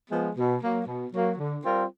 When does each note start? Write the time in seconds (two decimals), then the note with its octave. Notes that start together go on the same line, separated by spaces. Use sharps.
0.11 F3 G#3 B3
0.36 B2
0.62 F#3 A#3
0.87 B2
1.13 F#3 A#3
1.38 D3
1.64 G3 C4 F4 A#4